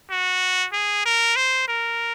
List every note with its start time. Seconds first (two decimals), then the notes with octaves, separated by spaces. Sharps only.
0.10 F#4
0.73 G#4
1.06 A#4
1.36 C5
1.68 A#4